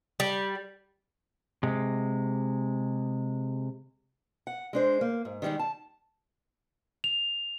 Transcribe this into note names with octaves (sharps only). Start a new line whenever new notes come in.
G3
C3 G#3
F#5
G#3 D4 C5
A#3
G#2
D#3 F3 G3 G#3 D#4
A5
F7